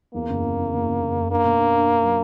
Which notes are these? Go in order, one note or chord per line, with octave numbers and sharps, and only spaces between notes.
E2 A#3
F#1
F#1
E2
F#1
F#1
F#1
F#1
A#3 D4
B2
D4
D4
D4
F#3